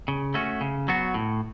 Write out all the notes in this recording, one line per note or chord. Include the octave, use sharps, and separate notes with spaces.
C#3
A3 C#4 F#4
C#3
F#3 B3 F#4
A2